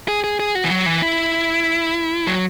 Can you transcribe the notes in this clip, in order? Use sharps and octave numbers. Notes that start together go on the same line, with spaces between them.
G#4
G#4
G#4
F#4
E3
F#3
E3
E4
F#3